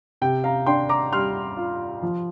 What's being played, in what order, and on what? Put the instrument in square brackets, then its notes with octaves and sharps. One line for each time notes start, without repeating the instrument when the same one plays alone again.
[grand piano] C3 G5
F5 A#5
D4 G5 C6
A#5 D6
G3 C6 F6
F4
F3